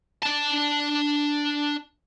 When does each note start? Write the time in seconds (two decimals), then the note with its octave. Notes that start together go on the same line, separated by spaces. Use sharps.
0.22 D4 A5